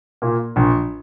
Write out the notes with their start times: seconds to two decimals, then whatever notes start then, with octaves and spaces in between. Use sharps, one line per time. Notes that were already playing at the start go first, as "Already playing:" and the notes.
0.22 A#2 A#3
0.56 A#1